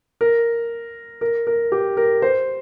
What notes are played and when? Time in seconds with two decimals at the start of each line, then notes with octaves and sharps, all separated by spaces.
0.21 A#4
1.21 A#4
1.47 A#4
1.72 G4
1.97 A#4
2.22 C5